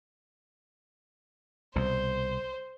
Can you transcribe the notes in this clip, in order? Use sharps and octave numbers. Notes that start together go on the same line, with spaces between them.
C2 B2 C5